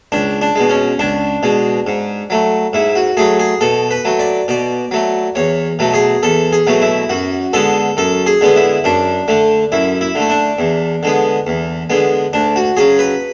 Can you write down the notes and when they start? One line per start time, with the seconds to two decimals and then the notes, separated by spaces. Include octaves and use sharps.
0.12 C#2 D4
0.42 D4
0.56 B2 G#3
0.70 C#4
0.99 C#2 D4
1.43 B2 G#3
1.87 G#2
2.30 F#3 A3
2.73 G#2 E4
2.95 F#4
3.17 F#3 A3 G#4
3.39 G#4
3.61 B2 A4
3.91 B4
4.05 F#3 A3
4.20 D5
4.48 B2 D5
4.91 F#3 A3
5.35 E2 C#5
5.79 B2 F#3 A3
5.94 G#4
6.23 E2 A4
6.53 G#4
6.67 B2 F#3 A3
6.82 E4
7.09 F#2 F#4
7.53 D3 G#3 B3 A4
7.97 F#2 A4
8.26 G#4
8.41 D3 G#3 B3
8.56 E4
8.84 F#2 D4
9.28 D3 A3
9.72 F#2 E4
10.01 E4
10.15 D3 A3
10.30 D4
10.59 E2
11.03 D3 G#3 B3
11.47 E2
11.90 D3 G#3 B3
12.33 D2 D4
12.56 F#4
12.77 C#3 F#3 G#4
12.99 B4